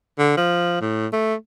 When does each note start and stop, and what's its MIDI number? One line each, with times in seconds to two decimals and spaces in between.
0.18 0.36 50
0.37 0.77 53
0.81 1.07 45
1.13 1.34 57